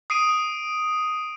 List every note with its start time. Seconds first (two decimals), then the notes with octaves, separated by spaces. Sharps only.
0.10 D#6 C7 D7 D#7